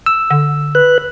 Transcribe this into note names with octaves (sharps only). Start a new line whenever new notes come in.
E6
D3
B4 F#6